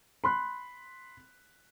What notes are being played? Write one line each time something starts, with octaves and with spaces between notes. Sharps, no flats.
B5 C6 F#6